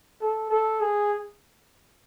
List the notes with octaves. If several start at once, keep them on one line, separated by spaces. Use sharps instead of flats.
A4
A4
G#4